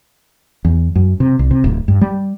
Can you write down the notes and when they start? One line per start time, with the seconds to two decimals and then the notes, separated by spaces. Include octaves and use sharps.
0.65 E2
0.96 F#2
1.20 C3
1.39 C2
1.51 C3
1.64 D1
1.88 G2
2.01 G3